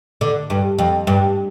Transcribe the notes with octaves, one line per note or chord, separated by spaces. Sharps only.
D3
G2
F2
G2